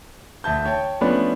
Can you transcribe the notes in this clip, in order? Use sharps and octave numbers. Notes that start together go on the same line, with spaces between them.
D2 E5 A5 G6
C#5 G5 A5
F3 A3 B3 C#4 D4 B4